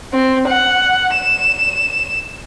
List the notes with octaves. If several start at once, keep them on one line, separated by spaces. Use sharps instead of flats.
C4
F#5
E7